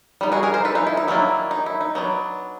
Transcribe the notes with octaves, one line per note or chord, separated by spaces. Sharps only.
G3 B3 D#4
F#4 G#4
G#4 A#4
A#4 C5
A4 B4
D#4 F4
E4
D#4
D#3 F#3 A#3 D4 E4
D#4
E4
D#4
F#3 B3 D4